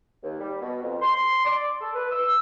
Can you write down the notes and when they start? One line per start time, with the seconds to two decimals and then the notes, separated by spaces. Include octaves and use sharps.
0.23 D#2
0.40 G3
0.61 B2
0.82 F2
1.02 C6
1.45 D5
1.81 A4
1.94 B4
2.11 E6